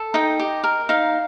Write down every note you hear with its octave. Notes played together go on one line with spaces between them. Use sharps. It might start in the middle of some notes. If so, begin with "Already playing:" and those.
Already playing: A4
D#4 D#5 G5
G4
A#4
D#4 F5